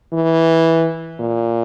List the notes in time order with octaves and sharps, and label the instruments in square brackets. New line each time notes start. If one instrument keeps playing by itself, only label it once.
[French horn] E3
A#2